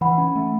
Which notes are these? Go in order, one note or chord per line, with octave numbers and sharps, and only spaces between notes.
E3 F#5 B5
C#4
A3